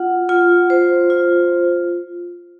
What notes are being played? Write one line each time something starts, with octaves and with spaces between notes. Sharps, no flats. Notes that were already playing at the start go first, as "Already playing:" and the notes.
Already playing: F4 F#5
F4
C5
F4